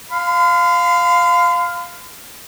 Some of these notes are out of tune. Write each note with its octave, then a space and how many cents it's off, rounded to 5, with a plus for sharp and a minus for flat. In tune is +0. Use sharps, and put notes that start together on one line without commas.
F5 +5 C6 -45